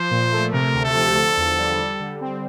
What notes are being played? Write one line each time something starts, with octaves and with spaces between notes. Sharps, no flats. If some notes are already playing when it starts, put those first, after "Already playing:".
Already playing: F3 C5
A#2
A3
C3 A#4
D2
A4
F3
D3
E2
G3
G3
D3
C4